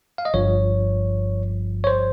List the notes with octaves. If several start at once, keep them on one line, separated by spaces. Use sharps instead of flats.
F5
D#5
G1 G2 F3 C#5
C#5
C5